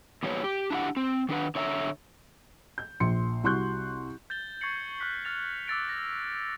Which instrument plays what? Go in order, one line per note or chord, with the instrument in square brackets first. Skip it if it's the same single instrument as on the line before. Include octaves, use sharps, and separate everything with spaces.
[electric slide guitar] A#2 E3 G3 B3 E4 C#5
G4
D4 E4 G4 F#5
C4
D#3 D4 B4 F#5
D3 C#5 E5 F#5 A#5
[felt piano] G6
A#1 C6 C#7
C2 F#4 C6 C#6 F#6 G6
[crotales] G6 A6 G7
C#6 G#6 A6 C7 C#7 F#7
C#6 F6 F#6 B6
F6 A6 F7
D6 E6 A6 D7
A#6